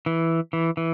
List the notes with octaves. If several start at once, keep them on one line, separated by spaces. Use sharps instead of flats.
E3
E3
E3